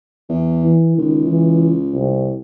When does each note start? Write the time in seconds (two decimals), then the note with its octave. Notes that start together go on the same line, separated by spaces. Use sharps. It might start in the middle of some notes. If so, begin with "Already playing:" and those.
0.29 E2
0.64 E3
0.98 C#2 D#3
1.27 E3
1.94 C2